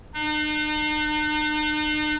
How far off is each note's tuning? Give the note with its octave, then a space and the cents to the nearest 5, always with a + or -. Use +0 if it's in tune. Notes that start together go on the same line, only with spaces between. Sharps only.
D#4 -45